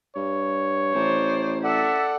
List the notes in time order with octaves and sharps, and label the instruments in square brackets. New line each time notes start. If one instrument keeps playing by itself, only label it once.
[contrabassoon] G2 [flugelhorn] C#5
[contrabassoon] A1 [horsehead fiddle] C5 D5
[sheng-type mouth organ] A4 D5 F#5 [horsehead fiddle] E5